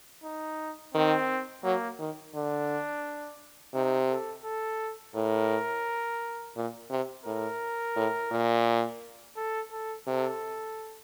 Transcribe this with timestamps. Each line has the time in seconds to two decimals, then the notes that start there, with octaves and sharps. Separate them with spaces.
0.24 D#4
0.94 D#3 C4
1.64 F#3 A#3
1.99 D#3
2.35 D3 D4
3.74 C3 D#4
4.09 A4
4.44 A4
5.14 A2 A#4
6.56 A#2
6.91 C3
7.26 A2 A#4
7.96 A2
8.31 A#2
9.36 A4
9.72 A4
10.07 C3 A4